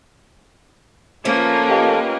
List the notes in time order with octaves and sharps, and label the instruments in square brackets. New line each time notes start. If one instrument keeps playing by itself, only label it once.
[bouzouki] F3 A3 [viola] A#3 C#4 [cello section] F4 A#4 B4
[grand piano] G4 D#5 F5